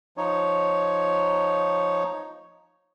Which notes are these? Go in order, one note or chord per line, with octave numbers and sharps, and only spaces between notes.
F3 D#4 C#5